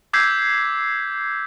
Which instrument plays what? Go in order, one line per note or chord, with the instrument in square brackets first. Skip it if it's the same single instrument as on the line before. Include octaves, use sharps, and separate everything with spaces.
[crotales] D6 E6 G6 G#6 B6 C7